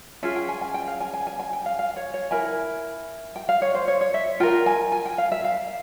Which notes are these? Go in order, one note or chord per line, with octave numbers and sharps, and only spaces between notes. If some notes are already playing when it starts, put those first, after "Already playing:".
C#4 F4 G#4 E5
G5
G#5
G#5
G5
F5
G#5
G#5
G#5
G#5
G5
F5
F5
C#5
C#5
E4 A#4 G#5
G5
F5
C#5
C5
C#5
C#5
E5
F4 A#4 G5
G#5
G#5
G5
F5
E5
F5